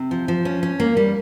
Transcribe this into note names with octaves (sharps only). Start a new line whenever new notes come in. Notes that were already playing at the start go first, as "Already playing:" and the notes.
Already playing: C3
F3
F3
C#4
C#4
A#3
G3